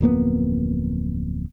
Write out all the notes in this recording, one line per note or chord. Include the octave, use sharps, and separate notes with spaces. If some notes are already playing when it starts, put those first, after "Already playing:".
D1 F2 A#3 B3